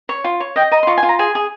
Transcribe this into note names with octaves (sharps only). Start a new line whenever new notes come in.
C#5
F4
C#5
D#5 G5
D#5 A#5
C6
F4 C#6
G#5
F4
A#5
G#4 G#5
G#4